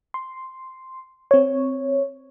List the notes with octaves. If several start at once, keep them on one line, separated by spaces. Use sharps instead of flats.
C6
C4 C#5